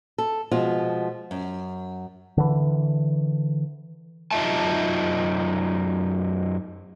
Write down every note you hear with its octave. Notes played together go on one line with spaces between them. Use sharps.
A4
B2 F3 G#3 F4
F#2
D3 E3
F#2 D#4 F4 E5 A5